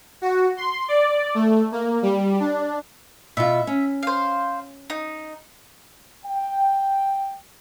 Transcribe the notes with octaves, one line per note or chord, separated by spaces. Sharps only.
F#4
C6
D5
A3
A#3
G3
D4
B2 F4 E5
C#4
C5 F5
D#4
G5